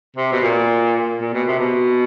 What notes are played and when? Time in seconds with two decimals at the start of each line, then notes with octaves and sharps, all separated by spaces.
0.17 C3
0.32 B2
0.43 A#2
1.21 A#2
1.34 B2
1.48 C3
1.60 B2